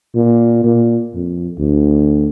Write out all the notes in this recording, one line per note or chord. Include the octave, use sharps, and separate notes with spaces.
A#2
A#2
F2
D2